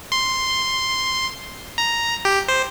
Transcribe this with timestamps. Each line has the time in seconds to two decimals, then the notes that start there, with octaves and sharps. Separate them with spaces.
0.12 C6
1.78 A#5
2.25 G4
2.48 C5